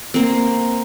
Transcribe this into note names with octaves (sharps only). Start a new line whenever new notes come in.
A#3 C4